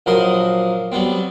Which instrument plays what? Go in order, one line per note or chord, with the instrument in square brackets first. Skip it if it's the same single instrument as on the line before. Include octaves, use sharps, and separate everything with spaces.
[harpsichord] A#1 F3 F#3 A#4 C5 D#6
F#3 G3 B3 C4